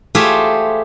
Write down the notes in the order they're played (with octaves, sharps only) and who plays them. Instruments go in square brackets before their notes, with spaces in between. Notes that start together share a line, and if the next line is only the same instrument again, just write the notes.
[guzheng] A3 F4 G4 G#4 C5 E5